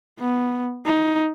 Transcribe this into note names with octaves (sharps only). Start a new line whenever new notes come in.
B3
D#4